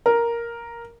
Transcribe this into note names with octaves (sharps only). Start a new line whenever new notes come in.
A#4